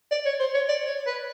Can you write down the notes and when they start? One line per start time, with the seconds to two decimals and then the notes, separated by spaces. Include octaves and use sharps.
0.11 D5
0.26 C#5
0.40 C5
0.54 C#5
0.69 D5
0.87 C#5
1.07 B4